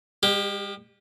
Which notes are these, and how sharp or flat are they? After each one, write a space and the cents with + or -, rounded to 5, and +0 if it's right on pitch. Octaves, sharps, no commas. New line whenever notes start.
G#3 -45 G4 +0